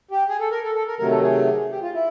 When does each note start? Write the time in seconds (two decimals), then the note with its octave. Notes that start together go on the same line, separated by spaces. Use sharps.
0.11 G4
0.29 G#4
0.40 A4
0.51 A#4
0.64 A4
0.75 A4
0.87 A#4
0.99 C3 D#3 F#3 A3 A#4
1.11 A4
1.23 G#4
1.71 G4
1.82 F4
1.94 E4